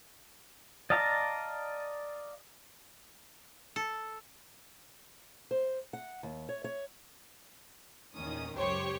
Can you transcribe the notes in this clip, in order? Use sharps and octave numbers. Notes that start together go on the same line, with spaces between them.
D5 D#5 F5 A5 A#5
A4
C5
F#5
D#2
C#5
C#5
E2 A#2 D#3 C#4 D#6
C#2 F#2 G4 C5 C#5 G5